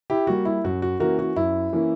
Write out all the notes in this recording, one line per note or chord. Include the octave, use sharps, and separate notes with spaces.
E4 G4
G3 A#3 F#4
E4
F#2 F#4
F#4
E3 A#3 C#4 F#4 A#4
F#4
F#2 E4
E3 A#3 C#4